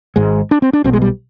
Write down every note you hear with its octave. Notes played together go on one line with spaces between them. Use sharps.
G#1 G#2 G#3
D4
C4
D4
B1 B2 C4
G#3
G3